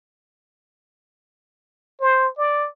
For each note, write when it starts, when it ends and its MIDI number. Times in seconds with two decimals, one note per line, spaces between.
2.01 2.28 72
2.38 2.68 74